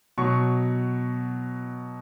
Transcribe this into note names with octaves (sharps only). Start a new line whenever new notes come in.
B2 F#3 C#6